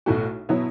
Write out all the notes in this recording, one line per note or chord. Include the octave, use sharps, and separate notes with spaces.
B1 A2 A3 F#4
B2 F#3 B3 E4